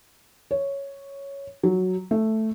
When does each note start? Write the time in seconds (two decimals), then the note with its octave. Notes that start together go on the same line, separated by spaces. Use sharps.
0.51 C#5
1.63 F#3
2.11 A3